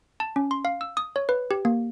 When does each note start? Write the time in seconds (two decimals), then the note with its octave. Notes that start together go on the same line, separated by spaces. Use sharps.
0.20 A5
0.36 C#4
0.51 C6
0.65 F5
0.81 E6
0.97 D#6
1.16 C#5
1.29 B4
1.51 G4
1.65 A#3